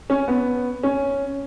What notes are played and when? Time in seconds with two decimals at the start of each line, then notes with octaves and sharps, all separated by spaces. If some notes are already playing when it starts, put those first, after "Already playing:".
0.10 C#4
0.28 B3
0.83 C#4